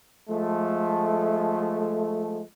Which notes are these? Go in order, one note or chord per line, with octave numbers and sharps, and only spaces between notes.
F3 G#3 A3